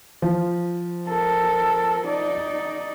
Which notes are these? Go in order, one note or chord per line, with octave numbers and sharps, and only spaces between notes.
F3
A4 A#4
D#4 D5